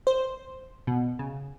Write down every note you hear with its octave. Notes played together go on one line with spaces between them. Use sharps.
C5
B2
C#3